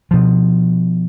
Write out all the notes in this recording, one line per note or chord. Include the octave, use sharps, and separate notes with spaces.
B2 F3